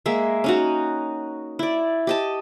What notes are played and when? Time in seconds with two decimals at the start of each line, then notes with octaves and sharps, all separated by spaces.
0.06 G#3 A#3 E5
0.44 C#4 D#4 F#4
1.59 E4 D5
2.07 G4 D#5 A5